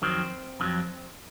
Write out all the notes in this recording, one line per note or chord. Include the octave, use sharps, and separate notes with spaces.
F2 D#3 F#3 C4
F2 D#3 F#3